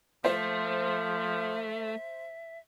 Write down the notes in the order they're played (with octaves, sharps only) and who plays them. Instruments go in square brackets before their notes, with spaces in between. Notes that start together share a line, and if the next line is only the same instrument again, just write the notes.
[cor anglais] F3 [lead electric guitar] A3 [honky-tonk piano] C5 [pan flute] E5